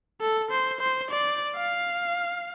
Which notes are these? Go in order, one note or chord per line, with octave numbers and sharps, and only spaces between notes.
A4
C5
C5
D5
F5